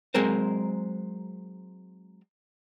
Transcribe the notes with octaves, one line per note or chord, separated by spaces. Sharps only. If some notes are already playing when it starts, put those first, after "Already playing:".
F#3 G#3 C4 A#4 C5